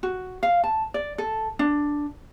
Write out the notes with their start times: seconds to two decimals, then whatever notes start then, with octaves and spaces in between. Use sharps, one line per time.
0.03 F#4
0.43 F5
0.64 A5
0.94 D5
1.18 A4
1.59 D4